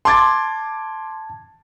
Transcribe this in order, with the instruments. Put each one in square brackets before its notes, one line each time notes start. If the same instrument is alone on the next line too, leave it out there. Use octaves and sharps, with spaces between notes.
[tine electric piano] A5 G#6 [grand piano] C6 D6 A6